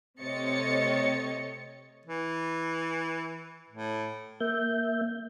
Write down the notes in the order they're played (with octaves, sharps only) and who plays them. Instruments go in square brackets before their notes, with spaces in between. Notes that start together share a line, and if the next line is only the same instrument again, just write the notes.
[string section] C3 A3 C#5 D#5 A6 C#7
[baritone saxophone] E3
A2
[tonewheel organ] A#3 E5 G6